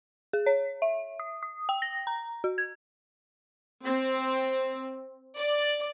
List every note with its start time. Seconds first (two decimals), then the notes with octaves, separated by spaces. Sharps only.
0.33 G#4
0.46 C#5
0.82 E5
1.20 D#6
1.43 D#6
1.69 G5
1.82 A#6
2.07 A#5
2.44 F#4
2.58 G#6
3.85 C4
5.38 D5